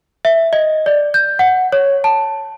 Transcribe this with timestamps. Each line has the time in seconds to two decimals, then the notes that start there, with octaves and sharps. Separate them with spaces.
0.25 E5
0.53 D#5
0.86 D5
1.14 G6
1.39 F#5
1.72 C#5
2.04 A5